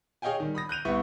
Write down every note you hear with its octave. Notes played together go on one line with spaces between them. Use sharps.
G#4 C#5 D#5 F5 G5 G#5
D#3 G3
B5 D#6 A#6
F#6 G6 D#7 F7
C2 B3 E4 B5 C#6